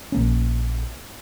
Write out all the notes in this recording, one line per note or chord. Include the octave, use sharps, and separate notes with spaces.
A#1 A#3 C#4